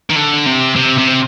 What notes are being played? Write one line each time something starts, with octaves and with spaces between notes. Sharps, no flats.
D#3
D3
C3
C3
C3